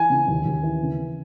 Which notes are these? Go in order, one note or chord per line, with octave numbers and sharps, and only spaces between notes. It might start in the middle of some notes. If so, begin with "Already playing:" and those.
Already playing: E3 G#5
C#3
D#2
D#2
E3
C#3